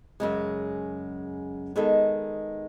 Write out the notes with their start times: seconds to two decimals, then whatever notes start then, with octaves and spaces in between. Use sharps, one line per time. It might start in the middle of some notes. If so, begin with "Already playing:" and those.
0.20 F#2 C#3 G#3
1.76 D#3 G#3 B3 D#4 A4